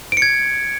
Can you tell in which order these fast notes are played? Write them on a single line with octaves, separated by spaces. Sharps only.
D7 C#7 G#6